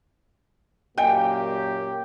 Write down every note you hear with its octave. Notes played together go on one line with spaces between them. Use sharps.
F#2 A#2 A#3 G4 D#5 G5 G#5